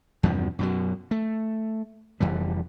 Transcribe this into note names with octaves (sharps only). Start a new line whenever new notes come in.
E2 G2 C3 F3
F#2 B2 F#3
A3
F1 F2 E3 G3